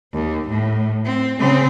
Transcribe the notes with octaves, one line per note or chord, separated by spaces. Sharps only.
D#2
A2
C4
C#3 C4